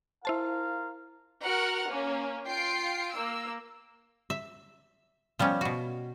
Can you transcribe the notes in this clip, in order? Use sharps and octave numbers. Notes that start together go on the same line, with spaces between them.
E4 F4 A#4 C5 F5 A5
F#4 A#4 F#5 F6
A#3 C#4
F4 G5 C7 D7
A#3 E6
E5
F3 G3 B3 C#4
B2 F#4